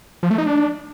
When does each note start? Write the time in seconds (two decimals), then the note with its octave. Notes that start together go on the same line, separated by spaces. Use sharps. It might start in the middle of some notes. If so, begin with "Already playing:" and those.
0.23 F3
0.31 A3
0.38 D#4
0.46 D4